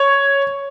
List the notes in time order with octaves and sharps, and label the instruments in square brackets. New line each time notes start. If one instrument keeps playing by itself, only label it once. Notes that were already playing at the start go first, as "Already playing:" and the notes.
Already playing: [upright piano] C#5